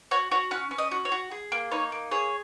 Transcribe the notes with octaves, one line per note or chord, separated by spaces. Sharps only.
F#4 C#5
F#4 C#5
C#4 F#5
C#4
D#5
F#4
C#5
F#4
G#4
A#3
D#4 C#5
A#3
G#4 C#5